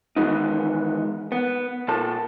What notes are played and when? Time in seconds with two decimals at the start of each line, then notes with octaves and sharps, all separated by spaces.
0.16 D#3 E3 G#3 B3 D#4
1.32 B3
1.88 A#2 A4 A5